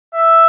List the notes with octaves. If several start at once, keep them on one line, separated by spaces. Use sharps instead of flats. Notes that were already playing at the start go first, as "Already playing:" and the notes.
E5